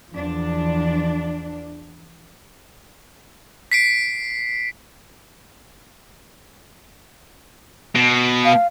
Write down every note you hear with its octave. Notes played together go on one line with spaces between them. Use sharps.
E2 F3 D4
B6 C7 D7
B2
F5